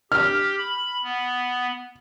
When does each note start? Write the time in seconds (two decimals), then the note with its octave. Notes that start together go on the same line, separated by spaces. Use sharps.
0.12 G4 F6
0.58 B5
1.03 B3